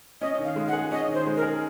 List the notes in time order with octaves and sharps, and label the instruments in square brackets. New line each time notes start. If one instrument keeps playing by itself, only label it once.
[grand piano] C#4 [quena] D#5
[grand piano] D#3
[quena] F5
[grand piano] G#3
[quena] F#5
[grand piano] G#4
[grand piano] C#4 [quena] D#5
[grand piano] D#3
[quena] C5
[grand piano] G#3
[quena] A#4
[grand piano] G#4